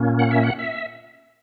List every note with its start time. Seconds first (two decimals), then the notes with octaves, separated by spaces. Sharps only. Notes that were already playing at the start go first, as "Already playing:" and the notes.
Already playing: A#2 A#3 C#4
0.19 F#5
0.31 E5
0.43 F#5
0.59 E5